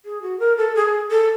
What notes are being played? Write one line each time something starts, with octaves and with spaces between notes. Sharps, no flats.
G#4
F#4
A#4
A4
G#4
A4